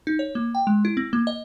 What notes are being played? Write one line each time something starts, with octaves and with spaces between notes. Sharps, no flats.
D#4
C#5
A#3
G5
G#3
E4
C4
A#3
D#5